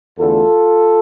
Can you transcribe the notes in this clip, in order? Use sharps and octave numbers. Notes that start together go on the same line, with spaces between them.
E2 D3 A3 F4 A4